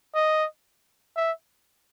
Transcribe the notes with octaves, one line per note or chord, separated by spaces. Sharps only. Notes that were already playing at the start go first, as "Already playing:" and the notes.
D#5
E5